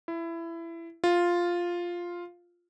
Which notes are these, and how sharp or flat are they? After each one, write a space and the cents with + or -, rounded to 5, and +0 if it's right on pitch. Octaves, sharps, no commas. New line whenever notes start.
E4 +20
F4 +0